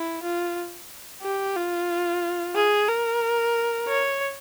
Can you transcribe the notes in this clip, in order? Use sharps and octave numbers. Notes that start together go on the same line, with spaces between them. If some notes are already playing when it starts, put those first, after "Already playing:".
Already playing: E4
F4
G4
F4
G#4
A#4
C#5